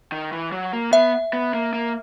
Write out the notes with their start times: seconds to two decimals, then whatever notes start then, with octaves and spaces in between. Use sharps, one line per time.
0.12 D#3
0.32 E3
0.52 F#3
0.73 A#3
0.93 B3 E5
1.33 B3
1.54 A#3
1.73 A#3